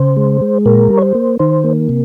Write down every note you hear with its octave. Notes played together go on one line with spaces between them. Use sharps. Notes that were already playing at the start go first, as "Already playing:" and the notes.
Already playing: C#3 C5
G#3
G#3
A#2 A#4
G3
C#5
C5
A#3
D#3 C5
A#3
C3